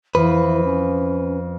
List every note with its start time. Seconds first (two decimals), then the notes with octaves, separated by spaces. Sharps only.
0.15 F2 E3 B4
0.64 C#4